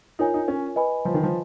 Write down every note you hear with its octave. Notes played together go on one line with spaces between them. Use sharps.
D#4 F4 A#4 C#5 G#5
D#4
C#4
B4 D#5 G#5 B5
F3
D#3
F3